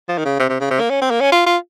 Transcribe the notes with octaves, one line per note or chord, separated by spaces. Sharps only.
F3
D#3
C#3
C3
C3
C#3
C3
A#3
C#4
C4
A#3
C#4
F4
F4